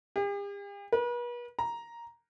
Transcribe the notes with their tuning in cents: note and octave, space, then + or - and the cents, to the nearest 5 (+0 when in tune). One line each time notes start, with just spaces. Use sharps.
G4 +45
B4 -40
A#5 +5